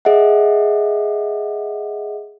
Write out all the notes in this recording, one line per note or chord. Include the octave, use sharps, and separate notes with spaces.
G#4 D#5 E5 F#5